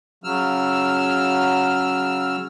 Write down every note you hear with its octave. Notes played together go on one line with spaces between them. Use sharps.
C#3 F#3 E6 F6